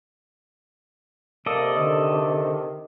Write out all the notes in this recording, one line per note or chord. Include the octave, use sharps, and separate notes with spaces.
C3 A#3 A4 D5 D#5
D3 D#3